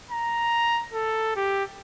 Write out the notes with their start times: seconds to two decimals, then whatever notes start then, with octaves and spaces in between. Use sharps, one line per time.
0.11 A#5
0.93 A4
1.36 G4